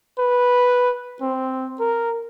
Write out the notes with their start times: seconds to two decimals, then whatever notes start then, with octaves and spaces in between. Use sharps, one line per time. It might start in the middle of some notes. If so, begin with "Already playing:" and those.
0.19 B4
1.21 C4
1.80 A#4